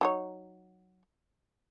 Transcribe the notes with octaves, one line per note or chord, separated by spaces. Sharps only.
F#3 D#4 C#5